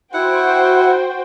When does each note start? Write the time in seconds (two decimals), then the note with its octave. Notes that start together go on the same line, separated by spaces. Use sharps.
0.14 E4 F#4 C5 F#5 G5